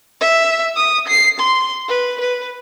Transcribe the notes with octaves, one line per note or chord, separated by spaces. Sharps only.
E5
D#6
C7
C6
B4
B4